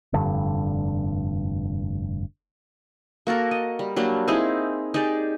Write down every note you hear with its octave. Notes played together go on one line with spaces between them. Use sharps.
F1 G2 D3
A#3 F#4 A4 A#4
D#5
G3
F#3 G3 A#3 D4
C4 D#4 E4 G#4
D#4 G4 G#4 D5